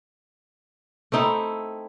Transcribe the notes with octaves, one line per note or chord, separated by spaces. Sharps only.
A3 C4 D#4 E4